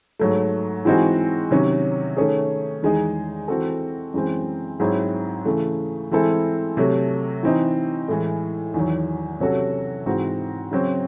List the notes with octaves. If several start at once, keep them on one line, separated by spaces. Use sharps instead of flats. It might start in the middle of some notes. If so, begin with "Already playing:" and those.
G#2 F#3 A3
E3 G#3 C4 D#4 F#4
C3 D#3 F#3 C#4
D#3 A3 C#4 G#4
E2 D#3 G#3 D#4 G#4
E3 C4 F#4 A4
F#2 E3 G#3 C4
G#2 F#3 C4 E4 G#4
C#3 E3 A3
E3 G#3 C4 E4 A4
C3 F#3 A3
E3 C4 D#4
A2 E3 G#3
E2 D#3 F#3
C3 F#3 C#4 F#4 A4
G#2 E3 C4 F#4
C#3 F#3 C4